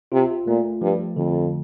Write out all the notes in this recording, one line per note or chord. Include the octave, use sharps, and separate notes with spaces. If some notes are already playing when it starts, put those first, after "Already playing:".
C3 F4
A#2 A3
G2 F3
F2 D3